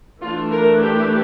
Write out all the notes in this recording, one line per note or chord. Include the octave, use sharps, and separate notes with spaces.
E3 A3 D4 F4
A#4
G4